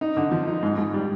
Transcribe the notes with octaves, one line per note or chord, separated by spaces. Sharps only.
D#4
D3
F3
D#4
G#2
G#2
G3